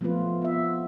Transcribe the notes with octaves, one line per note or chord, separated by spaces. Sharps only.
F3 A3 B3 C4 F4 B4
B3 E5